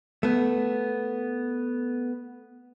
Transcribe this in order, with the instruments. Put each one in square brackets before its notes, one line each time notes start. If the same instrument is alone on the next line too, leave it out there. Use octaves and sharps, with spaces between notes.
[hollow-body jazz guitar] A3 B3